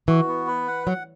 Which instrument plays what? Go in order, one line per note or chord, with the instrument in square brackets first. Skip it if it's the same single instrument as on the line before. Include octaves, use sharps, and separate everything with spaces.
[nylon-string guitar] E3 [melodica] F#4
[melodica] B3
B4
F#5
[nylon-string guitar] F#3 [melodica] F#5